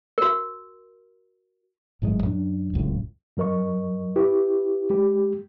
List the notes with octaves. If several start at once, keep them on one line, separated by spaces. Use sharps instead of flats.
F#4 A#4
G#1 A2 F#3 G#3
F#2 F#3 C4 D4
D1 C#2 F#2 A2
F#2 F#3 A#4 D#5 C#6
E4 G4 B4
G#3 G4